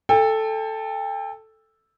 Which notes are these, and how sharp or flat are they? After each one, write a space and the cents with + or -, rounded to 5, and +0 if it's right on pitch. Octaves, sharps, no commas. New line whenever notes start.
A4 +0 G5 +35